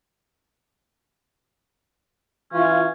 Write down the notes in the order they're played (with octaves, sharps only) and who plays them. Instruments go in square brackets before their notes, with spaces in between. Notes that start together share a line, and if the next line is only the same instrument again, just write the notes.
[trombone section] E3 F4 [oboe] C#4